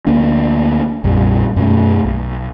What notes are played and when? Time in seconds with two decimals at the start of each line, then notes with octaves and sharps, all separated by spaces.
0.07 D2 A#3 D4
1.04 A#1 F2 A#2 G3
1.56 F#2 B2 A3
2.05 B1